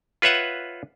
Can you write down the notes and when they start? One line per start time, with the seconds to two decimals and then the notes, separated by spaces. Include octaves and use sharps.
0.22 F4 B4 C#5 E5 F#5